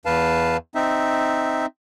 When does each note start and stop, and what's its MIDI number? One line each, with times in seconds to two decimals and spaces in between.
0.06 0.57 40
0.06 0.57 71
0.06 0.57 77
0.06 0.57 81
0.75 1.66 60
0.75 1.66 63
0.75 1.66 76